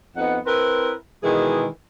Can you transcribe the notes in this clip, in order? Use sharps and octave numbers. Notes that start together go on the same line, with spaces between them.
F2 B3 D#4 F#5
C4 E4 A#4 B4
B2 D#3 E3 G#3 G#4